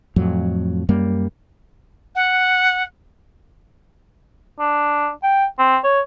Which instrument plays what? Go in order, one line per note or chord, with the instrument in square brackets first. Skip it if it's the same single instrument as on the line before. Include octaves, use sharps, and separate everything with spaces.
[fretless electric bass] F2 A2 F#3
F#2 G3 A#3
[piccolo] F#5
[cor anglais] D4
G5
C4
C#5